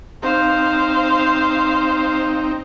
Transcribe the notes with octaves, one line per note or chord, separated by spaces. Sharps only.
C4 D#4 C5 F5